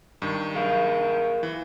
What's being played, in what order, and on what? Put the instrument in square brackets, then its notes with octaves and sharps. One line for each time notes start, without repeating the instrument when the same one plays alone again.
[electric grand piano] G2 D#3 C#6
[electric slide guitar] G#4 A#4 F5
[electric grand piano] E3